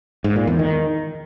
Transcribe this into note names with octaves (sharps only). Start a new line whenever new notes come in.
G#2
A#2
E2
D#3